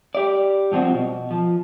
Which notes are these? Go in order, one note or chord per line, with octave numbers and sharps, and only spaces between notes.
G4 D5
G2 F3 C4 F#4
B2
F3